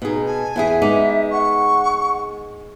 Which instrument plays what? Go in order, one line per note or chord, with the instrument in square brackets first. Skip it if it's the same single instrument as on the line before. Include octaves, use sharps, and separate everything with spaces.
[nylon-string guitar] B2 G#4 [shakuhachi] D#4
[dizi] G#5 [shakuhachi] A5
[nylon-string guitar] E2 E4 G#4 [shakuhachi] E5
[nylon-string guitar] G#3 B3 D#4 [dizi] D6
[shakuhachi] F#5 [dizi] C#6